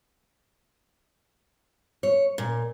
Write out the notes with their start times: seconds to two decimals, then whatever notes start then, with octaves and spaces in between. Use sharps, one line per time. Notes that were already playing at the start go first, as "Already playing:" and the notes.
2.03 C#5
2.38 A#2